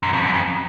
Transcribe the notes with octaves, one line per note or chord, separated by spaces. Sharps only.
F#2
F2
F#2
F2